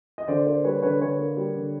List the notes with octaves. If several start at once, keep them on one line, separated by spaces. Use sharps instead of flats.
D#5
D3 C5 D5
A#3 C5 D5
G3 B4 C#5
D3 B4 C#5
D3 B4 C#5
A#3
G3
D3